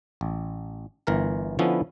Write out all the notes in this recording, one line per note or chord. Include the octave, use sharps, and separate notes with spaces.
A1
G1 E3 A#4 A#5
D3 F3 B3 C#4 E4